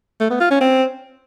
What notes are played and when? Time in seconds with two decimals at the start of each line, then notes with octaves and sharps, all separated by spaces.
0.20 A3
0.30 B3
0.40 F4
0.51 C#4
0.61 C4